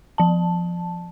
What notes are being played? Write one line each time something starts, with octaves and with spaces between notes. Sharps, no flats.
F3 A5